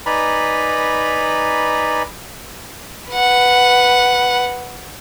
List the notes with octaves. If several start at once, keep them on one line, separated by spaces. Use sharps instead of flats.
D#4 B4 D5 G#5 A#5 B5
B4 F#5